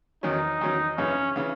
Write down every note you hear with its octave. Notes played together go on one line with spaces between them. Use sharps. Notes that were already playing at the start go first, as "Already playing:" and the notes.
E2 D#3 F#3 C#4 D#4
E2 D#3 F#3 C#4
F#2 C#3 E3 C#4
C#3 E3